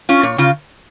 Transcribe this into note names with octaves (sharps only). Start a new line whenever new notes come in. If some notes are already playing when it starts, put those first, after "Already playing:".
C#4 F4
A#2 C#5
C#3 F4